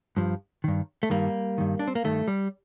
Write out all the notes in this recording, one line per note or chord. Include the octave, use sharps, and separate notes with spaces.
G2 F3
G2 D#3
A3
G2 D#3 G3 A#3
G2 D#3
D4
C4
A#3
G2 D#3 A3
G3